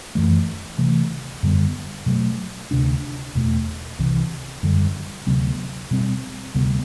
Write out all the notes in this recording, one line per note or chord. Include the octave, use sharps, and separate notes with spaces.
F#2 E3 A3
C3 E3 A3
F#2 D3 G3 B3
B2 F#3 A3
D2 C3 G3 D4
E2 B2 A3
C2 C3 E3
F#2 D3 G3
D2 C3 F#3 B3
B2 G3 C4
D2 C3 G3 B3